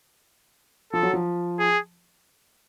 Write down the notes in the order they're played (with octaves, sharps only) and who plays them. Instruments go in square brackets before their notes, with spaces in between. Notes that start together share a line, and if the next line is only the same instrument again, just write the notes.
[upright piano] F3 [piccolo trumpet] A4
[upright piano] F#3
F3
[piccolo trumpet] G#4